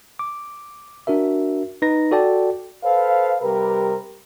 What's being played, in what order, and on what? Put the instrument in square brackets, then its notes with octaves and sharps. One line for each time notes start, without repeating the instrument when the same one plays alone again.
[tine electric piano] D6
D4 F#4 A#4 E5
D#4 B4 A#6
F#4 A4 D5 G5 A5
[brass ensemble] A4 B4 C5 F5
C3 G3 G4 A#4 B4